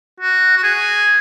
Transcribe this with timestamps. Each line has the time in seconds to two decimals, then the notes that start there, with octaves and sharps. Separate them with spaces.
0.20 F#4
0.57 F#4
0.63 G#4